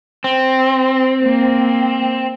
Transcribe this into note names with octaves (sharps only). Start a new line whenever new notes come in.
C4
A#3